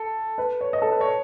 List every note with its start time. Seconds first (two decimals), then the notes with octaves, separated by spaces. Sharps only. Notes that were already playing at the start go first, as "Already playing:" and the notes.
Already playing: A4
0.38 B4
0.61 C#5
0.73 D#5
0.82 A4
0.92 B4
1.01 C#5